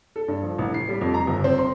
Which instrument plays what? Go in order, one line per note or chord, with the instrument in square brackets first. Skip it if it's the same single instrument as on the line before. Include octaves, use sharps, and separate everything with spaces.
[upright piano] A4
G2
F3
A1
C7
G3
F2
A#5
G1
C4
C6